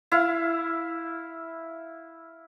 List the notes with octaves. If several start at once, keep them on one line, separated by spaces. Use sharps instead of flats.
E4 F5